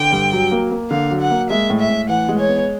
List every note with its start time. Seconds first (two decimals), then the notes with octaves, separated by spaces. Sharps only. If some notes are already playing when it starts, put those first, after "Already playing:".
Already playing: D3 G5
0.12 G2
0.33 F#3
0.52 A#3
0.71 A#3
0.91 D3 F5
1.11 F#3
1.21 F#5
1.30 A#3
1.50 G#3 E5
1.70 A2
1.80 E5
1.90 A2
2.09 E3 F#5
2.29 G#3
2.39 C#5
2.48 B3